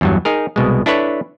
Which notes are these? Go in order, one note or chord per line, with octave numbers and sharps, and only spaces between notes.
E2 G2 F#3
D#4 G#4 A#4
C2 B2 G#3
D4 E4 A4 B4 C#5